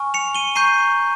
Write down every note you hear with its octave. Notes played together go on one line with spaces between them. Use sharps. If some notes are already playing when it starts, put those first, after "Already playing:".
Already playing: G#5 C#6 F6
C#7 F7
D#7 G7
A#5 C#6 G6 C7 D#7